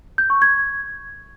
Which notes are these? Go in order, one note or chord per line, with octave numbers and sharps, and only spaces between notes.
G6
C#6
G#6